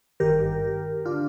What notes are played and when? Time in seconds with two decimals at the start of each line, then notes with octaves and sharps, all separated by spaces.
0.20 G#1 G2 D#3 G4 A#4
1.05 D3 D4 F4